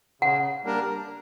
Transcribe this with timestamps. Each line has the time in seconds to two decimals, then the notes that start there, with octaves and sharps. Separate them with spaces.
0.22 C#3 F#5
0.64 G3 A#3 D4 A#4